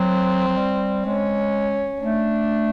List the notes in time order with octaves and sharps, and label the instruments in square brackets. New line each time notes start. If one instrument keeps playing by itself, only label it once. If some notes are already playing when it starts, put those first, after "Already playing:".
Already playing: [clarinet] F#3 [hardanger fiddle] C4
[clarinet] F#3
G3
[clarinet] G#3 [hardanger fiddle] C#4
[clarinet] A3 [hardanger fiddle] D4